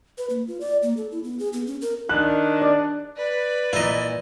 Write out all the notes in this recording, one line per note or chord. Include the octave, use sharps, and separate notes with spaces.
B4
A#3
F4
D5
A#3
A4
E4
B3
G#4
B3
C#4
A#4
D#3 D4 F#6
D5
B4 D5
A#2 E3 E4 D#5